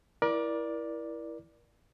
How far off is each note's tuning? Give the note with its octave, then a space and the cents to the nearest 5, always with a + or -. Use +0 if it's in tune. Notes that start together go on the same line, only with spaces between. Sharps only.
E4 +0 A#4 +35 D5 +0